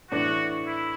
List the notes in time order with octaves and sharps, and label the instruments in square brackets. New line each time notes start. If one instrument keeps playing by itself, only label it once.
[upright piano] A2 E3 D4 [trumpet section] F#4
[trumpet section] E4